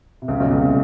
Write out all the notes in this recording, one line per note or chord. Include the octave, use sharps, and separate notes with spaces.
C3
C#2 C#3
B1 B2
C#2 C#3
C3